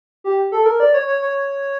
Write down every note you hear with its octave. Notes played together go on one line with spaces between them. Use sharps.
G4
A4
A#4
D5
C#5
C#5
C#5